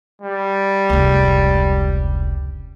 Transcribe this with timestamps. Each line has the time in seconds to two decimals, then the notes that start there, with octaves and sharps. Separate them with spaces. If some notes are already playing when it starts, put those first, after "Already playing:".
0.22 G3
0.89 F1 C#2